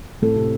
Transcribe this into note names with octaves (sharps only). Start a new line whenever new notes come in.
A2 A3 C4 A4
C3